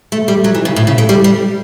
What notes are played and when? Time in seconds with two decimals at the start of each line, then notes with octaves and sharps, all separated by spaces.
0.12 A3
0.28 G3
0.44 F#3
0.55 E3
0.65 C#3
0.76 A2
0.87 C#3
0.98 A3
1.09 G3
1.24 G3